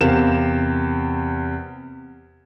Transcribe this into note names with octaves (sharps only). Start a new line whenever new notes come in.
E2 C3 G4 A#4 F5 E7